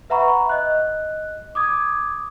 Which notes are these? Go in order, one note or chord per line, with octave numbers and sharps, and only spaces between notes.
B4 E5 F#5 A#5 B5 C#6
D#5 F#6
D6 D#6 G#6